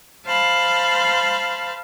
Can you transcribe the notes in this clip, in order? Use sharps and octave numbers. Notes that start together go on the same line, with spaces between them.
C5 F5 A5 B5